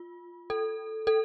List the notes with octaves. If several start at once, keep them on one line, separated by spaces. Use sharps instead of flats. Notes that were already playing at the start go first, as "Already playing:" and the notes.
Already playing: F4
A4
A4